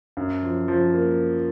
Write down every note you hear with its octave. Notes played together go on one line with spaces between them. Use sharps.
F#2
F3
F3
A#3